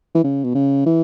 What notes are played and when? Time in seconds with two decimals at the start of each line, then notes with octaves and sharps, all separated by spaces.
0.15 E3
0.24 C#3
0.44 B2
0.54 C#3
0.86 E3